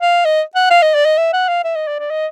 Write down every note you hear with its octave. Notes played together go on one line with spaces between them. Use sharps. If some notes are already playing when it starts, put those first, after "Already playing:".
F5
D#5
F#5
F5
D#5
D5
D#5
E5
F#5
F5
E5
D#5
D5
D5
D#5